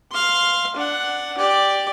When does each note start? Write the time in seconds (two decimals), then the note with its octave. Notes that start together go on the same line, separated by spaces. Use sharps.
0.11 F5 C6
0.76 D4 F#5
1.38 G4 D5